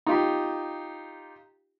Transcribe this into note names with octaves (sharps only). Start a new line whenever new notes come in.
D#4 F4 G4